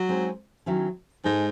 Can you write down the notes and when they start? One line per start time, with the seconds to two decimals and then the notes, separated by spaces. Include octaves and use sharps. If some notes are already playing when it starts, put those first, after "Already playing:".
Already playing: F#3
0.08 G#3 C4 D#4
0.66 D#3 F#3 C#4 E4
1.24 G#2 G#3 D#4 A4 D#5